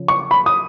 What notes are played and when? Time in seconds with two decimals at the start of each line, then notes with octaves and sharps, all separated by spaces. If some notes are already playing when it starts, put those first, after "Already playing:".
Already playing: C#3 F3
0.08 C#6
0.31 B5
0.46 D#6